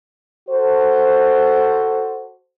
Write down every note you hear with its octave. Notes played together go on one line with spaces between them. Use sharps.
F#4 A4 C5